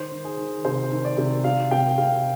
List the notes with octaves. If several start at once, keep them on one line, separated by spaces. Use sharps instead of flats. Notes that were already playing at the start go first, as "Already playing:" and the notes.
Already playing: D#3 C5
D#3
G#4
D#3
C3 C5
D#3
D5
C3
C3 F5
C3 G5
C3 F5